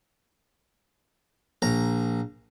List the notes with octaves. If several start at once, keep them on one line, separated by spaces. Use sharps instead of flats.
A#1 A#5